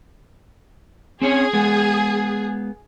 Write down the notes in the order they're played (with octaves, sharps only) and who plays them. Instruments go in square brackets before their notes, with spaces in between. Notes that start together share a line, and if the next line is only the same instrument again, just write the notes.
[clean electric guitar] C4 C#4 C#5 [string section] G#4
[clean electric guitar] G#3 B3